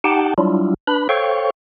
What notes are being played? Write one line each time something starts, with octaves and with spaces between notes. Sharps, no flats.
D#4 G4 F#5 G5 A5
F#3 G3 D4 E4 F4
D4 B4 B5
A4 C5 C#5 F5 G5 C#6